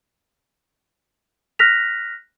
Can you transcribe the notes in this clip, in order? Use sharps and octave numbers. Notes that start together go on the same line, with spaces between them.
F6 F#6 A#6 B6 F7